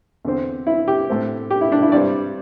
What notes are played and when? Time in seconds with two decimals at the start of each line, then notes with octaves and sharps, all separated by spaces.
0.25 E2 D3 C4
0.67 E4
0.88 G4
1.09 A2 A3 C4
1.51 G4
1.61 E4
1.72 D4
1.82 E4
1.92 G2 G3 C4 D5